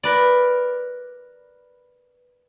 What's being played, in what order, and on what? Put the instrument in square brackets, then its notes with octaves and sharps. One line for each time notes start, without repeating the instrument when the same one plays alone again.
[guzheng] A#4 B4 D5